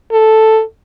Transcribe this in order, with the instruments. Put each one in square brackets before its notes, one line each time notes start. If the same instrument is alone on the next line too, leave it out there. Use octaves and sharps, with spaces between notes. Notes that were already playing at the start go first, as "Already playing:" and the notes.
[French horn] A4